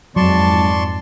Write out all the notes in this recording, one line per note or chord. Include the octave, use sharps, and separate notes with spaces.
F2 G#2 F#3 D5 A5 C6 C#6